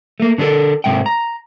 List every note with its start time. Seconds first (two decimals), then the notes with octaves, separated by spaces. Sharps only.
0.20 A3 A#3
0.38 D3 C4 D4 A4 A#4
0.84 G#2 C3 G#3 E5 G5
1.06 A#5